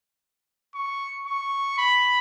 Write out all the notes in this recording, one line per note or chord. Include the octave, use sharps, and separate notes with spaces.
C#6
C#6
B5